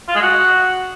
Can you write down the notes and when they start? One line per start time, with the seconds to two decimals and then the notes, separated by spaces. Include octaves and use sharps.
0.08 F4
0.15 G#3
0.22 F#4